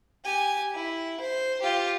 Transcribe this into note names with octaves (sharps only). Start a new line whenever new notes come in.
G4 G#5
E4
C5
F4 G4